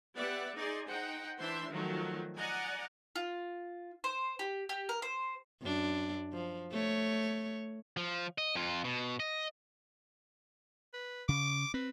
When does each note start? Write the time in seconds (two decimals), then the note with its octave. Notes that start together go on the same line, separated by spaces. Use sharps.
0.16 B3 G4 D5 E5 F#5
0.55 D#4 G#4 D5 C6
0.88 D#4 C5 F#5 G5
1.39 E3 D4 C5 E5 C6
1.72 D#3 F3 F#3 A3
2.37 D5 D#5 F#5 G#5 A#5
3.16 F4
4.04 C5
4.39 G4
4.69 G4
4.89 A#4
5.02 C5
5.62 F#2 D4
6.33 F3
6.71 A3 C#5
7.97 F3
8.38 D#5
8.55 F2 F4
8.84 B2
9.20 D#5
10.94 B4
11.29 C#3 D6
11.74 C4 B4